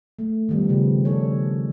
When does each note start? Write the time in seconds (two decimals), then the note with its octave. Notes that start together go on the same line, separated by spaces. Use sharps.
0.19 A3
0.49 D#3 F3 G3 B3
0.69 C#3 F3
1.05 D4 A4 C#5